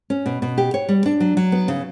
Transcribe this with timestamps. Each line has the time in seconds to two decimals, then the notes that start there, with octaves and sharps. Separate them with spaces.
0.10 C#4
0.26 B2
0.42 B2
0.58 G4
0.74 C#5
0.89 G3
1.06 D4
1.20 F#3
1.37 F#3
1.52 B3
1.68 C#3